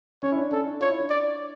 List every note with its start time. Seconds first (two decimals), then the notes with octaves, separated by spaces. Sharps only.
0.23 C#4 C#5
0.32 E4
0.37 D4
0.51 C#4 A4
0.67 D4
0.81 F4 C#5
0.90 E4
1.00 D4
1.10 D5